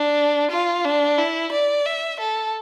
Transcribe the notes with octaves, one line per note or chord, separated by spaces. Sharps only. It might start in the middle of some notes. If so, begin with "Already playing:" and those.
Already playing: D4
F4
D4
E4
D5
E5
A4